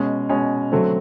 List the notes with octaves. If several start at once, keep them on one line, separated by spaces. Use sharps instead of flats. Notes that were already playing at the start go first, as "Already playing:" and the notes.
Already playing: B2 G#3 C#4
B2 G#3 C#4
D3 F#3 A3 C4